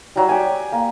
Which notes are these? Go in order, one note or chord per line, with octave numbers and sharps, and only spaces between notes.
F#3 G3
G4 G#5
A#3